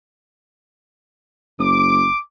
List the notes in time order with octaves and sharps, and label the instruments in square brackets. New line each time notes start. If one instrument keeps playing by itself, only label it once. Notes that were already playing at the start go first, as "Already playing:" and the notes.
[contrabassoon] F#1 [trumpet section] D6